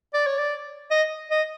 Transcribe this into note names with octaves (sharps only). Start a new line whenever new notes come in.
D5
C#5
D5
D#5
D#5